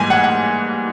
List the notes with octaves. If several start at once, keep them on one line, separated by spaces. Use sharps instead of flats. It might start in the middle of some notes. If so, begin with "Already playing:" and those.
Already playing: G#2 E3 G3 A#3 G#5
F#5
F#5